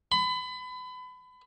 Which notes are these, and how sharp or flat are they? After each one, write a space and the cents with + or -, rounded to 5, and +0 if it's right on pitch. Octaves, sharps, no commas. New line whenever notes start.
B5 +30